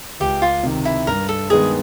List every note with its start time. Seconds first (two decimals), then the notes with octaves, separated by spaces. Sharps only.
0.20 C#2 G4
0.42 F4
0.63 C3 D#3
0.85 E4
1.07 G2 A#4
1.29 A4
1.50 D#3 G#3 B3 G#4